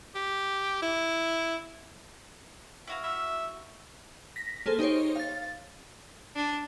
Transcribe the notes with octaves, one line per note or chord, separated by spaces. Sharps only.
G4
E4
E4 F#4 F5
E5
A#6 B6
A#3 G#4 A4 C5
D#4 G4 C5 C#5
F5 A6
D4